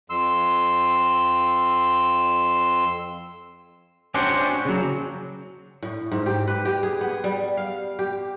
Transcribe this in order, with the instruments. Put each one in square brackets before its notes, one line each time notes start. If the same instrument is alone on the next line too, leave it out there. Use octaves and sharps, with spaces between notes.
[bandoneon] F2 C6 E6
[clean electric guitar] C#4 D4 F#4 G4 C5
C#3 F#3
[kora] A2
G#2
G4
B4
G4
G#4
B3
G3
F5
G4